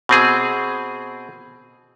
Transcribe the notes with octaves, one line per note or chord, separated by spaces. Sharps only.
B2 C4 G#4